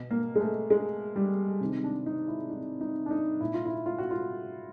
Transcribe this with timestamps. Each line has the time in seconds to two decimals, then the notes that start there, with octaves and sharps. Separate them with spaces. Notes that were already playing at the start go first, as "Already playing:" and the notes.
Already playing: B2
0.11 A#3
0.36 G#3
0.41 A3
0.70 G#3
1.16 G3
1.61 C3 D#3
1.84 D4
2.06 D#4
2.28 E4
2.50 D#4
2.81 D#4
3.06 D4
3.11 D#4
3.41 A#2 E4
3.54 F4
3.65 E4
3.86 F4
3.98 F#4
4.11 F4